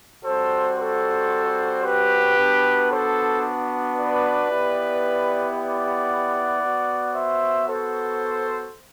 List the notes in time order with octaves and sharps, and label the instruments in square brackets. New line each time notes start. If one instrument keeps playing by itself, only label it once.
[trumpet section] G3 C4 F#4 A4 C5
A4 C5
G4 B4
B3 D4 F#4
A4 C5
B4 D5
B3 E4 G4
D5 F#5
B3 F#4
C5 E5
A4 C5